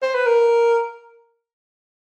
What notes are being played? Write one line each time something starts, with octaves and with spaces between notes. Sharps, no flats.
C5
B4
A#4